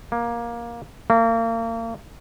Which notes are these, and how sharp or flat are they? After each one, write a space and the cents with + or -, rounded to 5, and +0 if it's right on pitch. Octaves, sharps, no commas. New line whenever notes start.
A#3 +15
A#3 -35